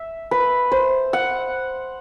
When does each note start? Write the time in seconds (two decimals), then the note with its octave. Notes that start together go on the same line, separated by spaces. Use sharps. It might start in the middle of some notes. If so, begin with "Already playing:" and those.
Already playing: E5
0.31 B4
0.71 C5
1.13 F#5